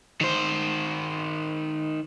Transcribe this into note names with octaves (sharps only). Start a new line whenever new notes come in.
D#3 C5